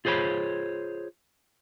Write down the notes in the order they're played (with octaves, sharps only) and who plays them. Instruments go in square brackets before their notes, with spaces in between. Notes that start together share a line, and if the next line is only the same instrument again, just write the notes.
[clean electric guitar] F4 G#4 C5 C#5 B5